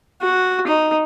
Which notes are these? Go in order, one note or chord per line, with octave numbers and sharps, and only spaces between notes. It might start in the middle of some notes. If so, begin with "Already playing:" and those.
F#4
D#4